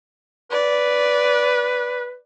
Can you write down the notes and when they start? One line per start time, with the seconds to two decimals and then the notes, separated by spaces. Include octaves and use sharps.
0.51 B4 D5